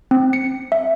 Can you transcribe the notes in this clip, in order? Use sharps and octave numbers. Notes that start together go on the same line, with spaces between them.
C4
C#7
E5